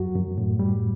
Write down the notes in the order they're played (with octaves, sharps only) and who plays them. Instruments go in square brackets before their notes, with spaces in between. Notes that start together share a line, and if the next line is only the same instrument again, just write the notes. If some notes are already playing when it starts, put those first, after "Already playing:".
Already playing: [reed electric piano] F#2 F#3 F#4
F#2
A2
G3